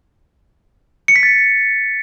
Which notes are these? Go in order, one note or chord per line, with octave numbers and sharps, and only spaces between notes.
C#7
B6
A6